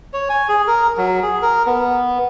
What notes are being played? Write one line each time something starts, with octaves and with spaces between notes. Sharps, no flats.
C#5
G#5
G#4
A#4
F#3
G#4
A#4
B3